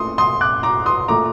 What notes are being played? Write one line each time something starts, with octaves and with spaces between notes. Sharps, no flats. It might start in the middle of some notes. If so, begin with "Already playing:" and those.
Already playing: A#2 A3 C6 D#6
C6 D#6
D6 F#6
A#5 D6
C6 D#6
A#2 A3 A#5 D6